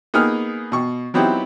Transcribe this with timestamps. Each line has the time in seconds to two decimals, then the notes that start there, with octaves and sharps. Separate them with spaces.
0.14 A#3 B3 D#4 G#4 A#4 F6
0.72 B2 C#6
1.14 F#3 B3 C4 D#4 E4 G4